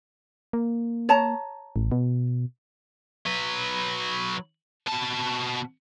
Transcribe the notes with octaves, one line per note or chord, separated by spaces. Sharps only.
A#3
C#5 A5 A#5
A1
B2
F#3 B4
B2 A5